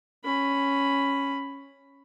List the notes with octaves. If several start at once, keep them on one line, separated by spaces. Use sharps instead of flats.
C#4 B5